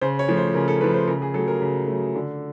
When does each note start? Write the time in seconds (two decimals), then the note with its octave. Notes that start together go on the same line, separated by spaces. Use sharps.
0.01 C#3 C5
0.19 C#5
0.28 F3 A3
0.37 C5
0.54 C#3 A#4
0.68 A4
0.81 F3 A3 B4
0.94 C5
1.08 C#3 A#4
1.22 G#4
1.34 F#3 A3 A4
1.48 A#4
1.62 C#3
1.88 F#3 A3
2.16 D3